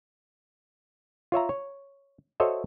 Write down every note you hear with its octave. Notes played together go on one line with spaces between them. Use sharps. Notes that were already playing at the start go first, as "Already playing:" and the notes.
F4 C#5 E5 A#5
C#5
F#4 A4 C5 C#5 D#5 E5